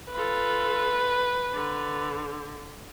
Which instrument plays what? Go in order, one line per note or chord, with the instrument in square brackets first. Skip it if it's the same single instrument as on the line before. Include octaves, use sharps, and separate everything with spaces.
[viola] F4 A4 [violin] B4
[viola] D3